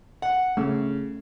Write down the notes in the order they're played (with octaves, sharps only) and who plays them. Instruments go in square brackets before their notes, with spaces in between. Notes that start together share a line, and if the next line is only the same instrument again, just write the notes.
[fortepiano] F#5
[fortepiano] C#3 [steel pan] A3